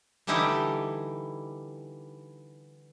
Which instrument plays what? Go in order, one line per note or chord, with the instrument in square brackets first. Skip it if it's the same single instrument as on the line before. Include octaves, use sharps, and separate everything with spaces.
[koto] D3 E3 G3 D#4 E4 G4